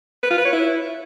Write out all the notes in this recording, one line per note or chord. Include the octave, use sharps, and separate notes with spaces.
B4
F4
B4
C#5
E4